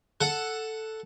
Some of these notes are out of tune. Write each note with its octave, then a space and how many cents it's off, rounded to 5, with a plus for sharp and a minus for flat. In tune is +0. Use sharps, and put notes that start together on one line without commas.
A4 +0 F#5 +0